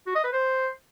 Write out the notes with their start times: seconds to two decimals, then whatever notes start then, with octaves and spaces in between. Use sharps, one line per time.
0.07 F#4
0.15 D#5
0.24 B4
0.33 C5